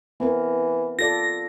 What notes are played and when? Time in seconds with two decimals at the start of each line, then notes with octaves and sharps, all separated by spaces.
0.20 E3 B3 C4 A#4
0.99 F4 A4 D5 A#6